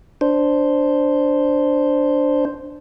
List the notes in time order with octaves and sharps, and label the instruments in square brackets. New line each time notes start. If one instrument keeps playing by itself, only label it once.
[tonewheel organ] D4 C5